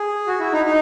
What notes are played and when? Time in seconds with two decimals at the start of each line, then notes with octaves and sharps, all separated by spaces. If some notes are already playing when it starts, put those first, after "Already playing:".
Already playing: G#4
0.27 F#4
0.40 E4
0.53 D#4
0.65 D#4